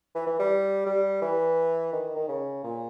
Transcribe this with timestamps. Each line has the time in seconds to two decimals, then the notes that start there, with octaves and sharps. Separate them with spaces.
0.15 E3
0.27 E3
0.39 G3
0.86 G3
1.22 E3
1.93 D#3
2.16 D#3
2.28 C#3
2.64 A#2